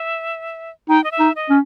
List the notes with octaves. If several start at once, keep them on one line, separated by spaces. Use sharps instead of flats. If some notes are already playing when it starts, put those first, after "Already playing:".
Already playing: E5
D#4 G5
D#5
E5
D#4
D#5
C#4